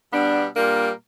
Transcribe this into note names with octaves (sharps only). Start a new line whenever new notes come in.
B2 G3 B3 D4
A#2 G3 A#3 D4 A#4